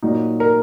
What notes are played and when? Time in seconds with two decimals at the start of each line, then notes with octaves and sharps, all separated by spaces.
0.02 A#2 F#3 A#3 D#4
0.40 A#4